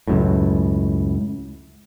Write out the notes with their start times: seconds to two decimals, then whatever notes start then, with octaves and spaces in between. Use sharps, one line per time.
0.08 C#2 F#2 A2